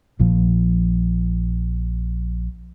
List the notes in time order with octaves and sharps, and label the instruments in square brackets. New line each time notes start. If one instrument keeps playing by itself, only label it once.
[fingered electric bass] A#1 A#2 F3